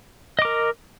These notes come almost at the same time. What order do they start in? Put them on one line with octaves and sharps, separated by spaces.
D#5 D6 A#4